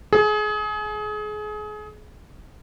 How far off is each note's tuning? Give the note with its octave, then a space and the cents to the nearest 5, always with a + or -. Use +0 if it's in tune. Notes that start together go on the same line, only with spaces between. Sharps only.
G#4 +30